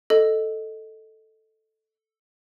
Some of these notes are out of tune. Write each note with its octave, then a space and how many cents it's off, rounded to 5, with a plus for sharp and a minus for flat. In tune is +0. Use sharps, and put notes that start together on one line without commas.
A4 +0 D#5 +0